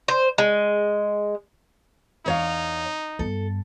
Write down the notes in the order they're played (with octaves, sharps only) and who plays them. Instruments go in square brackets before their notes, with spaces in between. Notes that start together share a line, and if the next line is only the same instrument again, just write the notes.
[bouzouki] C5
G#3
[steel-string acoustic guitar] E2 C#5 F5 [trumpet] D#4
[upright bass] G2 B3 [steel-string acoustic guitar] A4